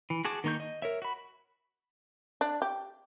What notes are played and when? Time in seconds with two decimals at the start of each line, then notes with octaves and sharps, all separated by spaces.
0.10 E3
0.25 F#4 G#4 A5 D6
0.44 D#3 A#3 D#4 C#6 G6
0.60 D#5
0.82 A#4 C#5 E5
1.02 F#4 B5
2.41 D4
2.62 G4